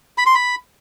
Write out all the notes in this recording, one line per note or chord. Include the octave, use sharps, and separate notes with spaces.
B5
C6
B5